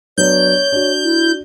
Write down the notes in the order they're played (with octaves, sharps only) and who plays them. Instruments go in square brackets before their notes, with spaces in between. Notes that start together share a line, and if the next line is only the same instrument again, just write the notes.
[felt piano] F#3 B3 D4 [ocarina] C#5 [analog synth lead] G6
[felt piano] D4 F#4
[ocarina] E4